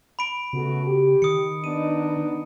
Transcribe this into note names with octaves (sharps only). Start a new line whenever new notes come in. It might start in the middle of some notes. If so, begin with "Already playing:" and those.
B5 D7
C#3 A3 B3 F#4
G4
D#3 D#6 C#7
B3 D4 D#4 D#7